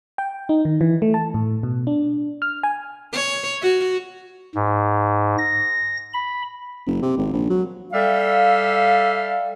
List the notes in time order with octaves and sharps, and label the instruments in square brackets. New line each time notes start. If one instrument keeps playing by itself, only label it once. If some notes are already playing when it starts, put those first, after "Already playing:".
[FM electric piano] G5
D#4
D#3
E3
A3
A5
A2
B2
D4
F6
G#5
[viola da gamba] C#5
F#4
[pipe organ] G#2
A#6
B5
[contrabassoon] F#1
C3
G#1
A#1
F#3
[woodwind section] G3 A4 E5 F5